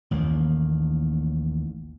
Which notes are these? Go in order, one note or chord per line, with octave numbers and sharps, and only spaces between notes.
A1 D#2 D#3 A#3